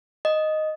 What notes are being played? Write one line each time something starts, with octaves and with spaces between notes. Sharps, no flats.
D#5